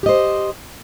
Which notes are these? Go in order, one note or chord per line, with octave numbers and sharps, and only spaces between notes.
G4 C5 D#5